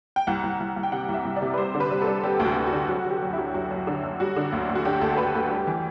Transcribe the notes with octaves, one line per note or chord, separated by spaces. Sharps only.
G5
C2 F#5
C2
C2
C2
G5
C3 F#5
C2
E5
C2
D5
C3
B4
G3 C5
D3
B4
G3
A4
G3
G3 G4
D2
F#4
D2
F#4
D3
F#3 F#4
F#3
G4
F#2
F#3 E4
F#2 F#4
F#2
D3
F#2
G3 F#4
D3
D2
D2
F#4
D3 G4
D2 A4
A4
D2 B4
D2 A4
G3 G4
E3